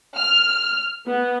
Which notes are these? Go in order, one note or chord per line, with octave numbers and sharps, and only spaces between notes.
F6
B3